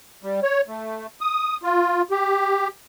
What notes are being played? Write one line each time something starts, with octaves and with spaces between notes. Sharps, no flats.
G3
C#5
A3
D#6
F4
G4